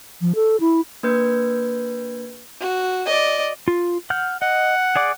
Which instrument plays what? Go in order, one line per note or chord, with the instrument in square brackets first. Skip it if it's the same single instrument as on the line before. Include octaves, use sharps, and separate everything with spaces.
[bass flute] F3
A4
E4
[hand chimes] A#3 D4 B4 G6 G#6
[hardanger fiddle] F#4
D5 D#5
[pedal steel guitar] F4
F#5 F6 G6
[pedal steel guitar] D#5 [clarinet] F#5
[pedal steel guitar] G#4 D5 D6